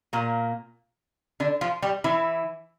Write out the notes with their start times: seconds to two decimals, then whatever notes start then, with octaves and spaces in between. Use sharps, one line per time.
0.13 A#2 A#3
1.40 D3 D4
1.61 F3 F4
1.82 G3 G4
2.04 E3 E4